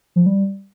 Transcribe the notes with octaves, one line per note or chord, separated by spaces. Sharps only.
F3
G3